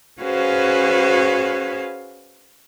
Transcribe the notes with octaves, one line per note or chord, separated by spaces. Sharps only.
C#4 F#4 G#4 B4 C5 F5